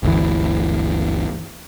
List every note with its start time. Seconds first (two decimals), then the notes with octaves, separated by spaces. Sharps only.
0.03 G1 D2 E3